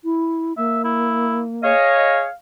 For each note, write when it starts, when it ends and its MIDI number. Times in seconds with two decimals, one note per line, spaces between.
0.04 0.53 64
0.57 1.72 58
0.57 0.83 76
0.84 1.41 64
1.63 2.25 68
1.63 2.25 73
1.63 2.25 75
1.63 2.33 77